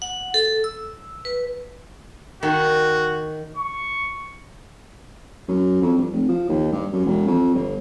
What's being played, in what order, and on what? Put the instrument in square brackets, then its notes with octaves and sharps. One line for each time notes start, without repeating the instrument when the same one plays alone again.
[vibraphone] F#5
A4
E6
B4
[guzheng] D#3 [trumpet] F#4
[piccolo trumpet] C#6
[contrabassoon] F#2
F2
G2
F1
F3
D#2
G2
F#2
E1
F2
G1